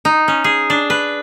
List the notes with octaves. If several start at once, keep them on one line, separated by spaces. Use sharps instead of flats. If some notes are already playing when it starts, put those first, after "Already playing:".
D#4
C#4
G#4
D4
B4